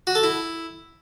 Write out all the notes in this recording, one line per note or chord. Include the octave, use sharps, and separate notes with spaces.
F#4
A4
E4